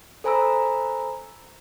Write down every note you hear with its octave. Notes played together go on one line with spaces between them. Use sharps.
A4 C5 G#5 A#5 B5 E6